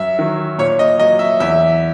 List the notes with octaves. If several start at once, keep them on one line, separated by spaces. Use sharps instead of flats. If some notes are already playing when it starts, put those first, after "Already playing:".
Already playing: F#2 E5
D#3 F#3
A#2 C#5
D#5
F#3 D#5
E5
E2 E5